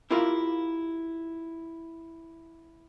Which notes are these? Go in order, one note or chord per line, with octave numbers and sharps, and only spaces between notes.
E4 F4 G4 A#4 F5